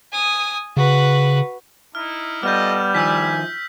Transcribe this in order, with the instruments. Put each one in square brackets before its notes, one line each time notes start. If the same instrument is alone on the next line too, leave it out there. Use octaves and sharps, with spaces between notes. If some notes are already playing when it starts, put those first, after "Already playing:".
[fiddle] G#5 D#6
[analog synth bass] C#3 [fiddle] F#4 B4
[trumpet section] D#4 E4 [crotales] F6
[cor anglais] G3 [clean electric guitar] B3 [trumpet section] F4 A4 D#5 [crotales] F6 G6
[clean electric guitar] D#3 F3 [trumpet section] G#5 [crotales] E6 G6 B6